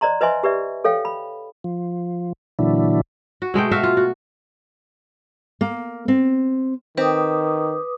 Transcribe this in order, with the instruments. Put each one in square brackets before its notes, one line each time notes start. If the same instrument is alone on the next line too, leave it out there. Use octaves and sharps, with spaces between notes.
[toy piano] C5 D5 D#5 A#5 C6
B4 C5 D#5 E5 G#5 C6
G4 B4 D5 E5
A4 C#5 F5 G5
B5
[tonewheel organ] F3
A#2 D3 E3 F#3 D4 E4
[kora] F#4
B2 G#3 A3 G5
F#4 E5 F5
F4
F#4
[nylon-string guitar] A#3
C4
[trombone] D#3 [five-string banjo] C4 [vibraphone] B4 D6 D#6